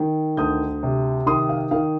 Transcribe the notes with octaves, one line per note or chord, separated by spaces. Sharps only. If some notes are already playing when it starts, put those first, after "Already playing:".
Already playing: D#3
D2 D#6 G6
C3
D#3 C6 D#6
F5
D#3 F5